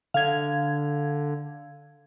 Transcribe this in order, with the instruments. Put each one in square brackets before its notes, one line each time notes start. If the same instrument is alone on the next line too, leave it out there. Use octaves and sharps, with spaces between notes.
[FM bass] D3 [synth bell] F5 G#6